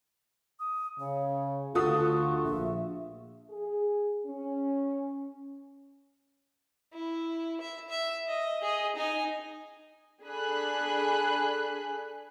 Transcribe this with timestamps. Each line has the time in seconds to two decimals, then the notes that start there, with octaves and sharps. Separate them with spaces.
0.59 D#6
1.00 C#3 C#5
1.75 D2 F4 F#4 A4 C#6 D#6
2.44 A#1 E5
3.50 G#4
4.26 C#4
6.93 E4
7.61 E5
7.90 E5
8.28 D#5
8.62 G#4 D#5
8.96 D#4 G#5
10.25 D4 G#4 A4 G#5 B5 F#6